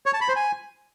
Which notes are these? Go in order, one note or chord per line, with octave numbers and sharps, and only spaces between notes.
C#5
A5
B5
C5
G#5